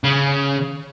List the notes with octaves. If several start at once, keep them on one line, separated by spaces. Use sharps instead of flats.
C#3